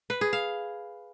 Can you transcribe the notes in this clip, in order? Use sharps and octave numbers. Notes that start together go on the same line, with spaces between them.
B4
G#4
F5